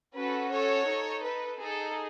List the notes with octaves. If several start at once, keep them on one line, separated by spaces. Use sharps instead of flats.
C#4 F#4 A4 B4
A4 C#5
D#4 A4
B4
D#4 G#4 A4